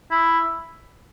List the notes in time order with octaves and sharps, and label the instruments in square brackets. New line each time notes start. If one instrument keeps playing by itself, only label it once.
[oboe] E4